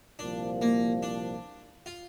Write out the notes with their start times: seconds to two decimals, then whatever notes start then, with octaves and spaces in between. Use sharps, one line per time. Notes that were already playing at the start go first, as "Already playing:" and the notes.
0.19 C2 A#2 F3 D4
0.61 A#3
1.03 D4
1.86 F4